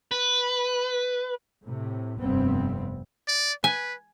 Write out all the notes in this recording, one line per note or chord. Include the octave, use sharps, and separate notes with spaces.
B4
A2 C3
F1 G2 B3 C4
D5
B4 G#5